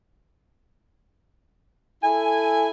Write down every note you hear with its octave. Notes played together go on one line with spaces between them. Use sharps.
E4 A4 G#5